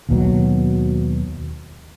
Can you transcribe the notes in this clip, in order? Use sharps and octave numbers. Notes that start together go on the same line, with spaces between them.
D#2 B2 F#3